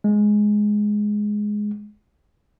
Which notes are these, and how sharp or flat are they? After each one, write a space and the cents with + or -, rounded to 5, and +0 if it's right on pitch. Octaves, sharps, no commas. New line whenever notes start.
G#3 +5